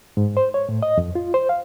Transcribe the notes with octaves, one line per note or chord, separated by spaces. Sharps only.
G#2
C5
C#5
A2
D#5
F2
F4
C5
F5